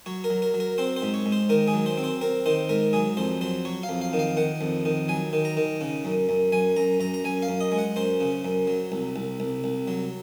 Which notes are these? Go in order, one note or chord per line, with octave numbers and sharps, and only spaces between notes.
F#3 C#5
A#4
F#3
A#4
F#3
A#4
C4 C5
C5
G#2
C#5
G#2
C5
D#3 A#4
G#4
F#3
C5
C4
C5
C4 A#4
D#3 C5
G#2 A#4
F#3 G#4
F2 C5
F#3 C5
F#3 C#5
F5
F2
F5
D#3
F5
D#3 F#5
F2
D#3
F#3 G#5
D#3
A#5
D#3
C#3
F#2
F#2
F#2 G#5
F#2 A#5
F#2 A#5
A#5
F#2 G#5
F5
F#2
D#5
G#3
F#5
F#2 C5
C#3
F#2
F#3
C2
C2
C2
C2
F#3